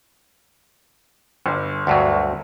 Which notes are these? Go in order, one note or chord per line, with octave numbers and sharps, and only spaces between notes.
G1
D2 G2 F#3